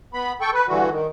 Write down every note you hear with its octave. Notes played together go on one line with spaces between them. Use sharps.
B3 B5
A4 G5 C#6
B4
G2 D3 E3 F#4
D#3